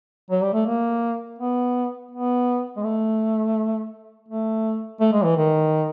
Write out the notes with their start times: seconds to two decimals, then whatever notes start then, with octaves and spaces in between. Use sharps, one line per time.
0.30 F#3
0.42 G3
0.54 A3
0.66 A#3
1.39 B3
2.11 B3
2.76 G#3
2.83 A3
4.29 A3
5.00 A3
5.12 G#3
5.24 E3
5.37 D#3